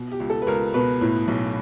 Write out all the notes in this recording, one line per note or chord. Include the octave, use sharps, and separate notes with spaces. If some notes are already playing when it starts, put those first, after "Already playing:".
Already playing: B2
G4
C#2
A4
B4
C#2 A#4
B2 B4
A2
B1